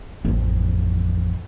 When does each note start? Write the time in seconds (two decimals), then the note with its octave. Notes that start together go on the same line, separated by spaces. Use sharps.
0.25 A1 F2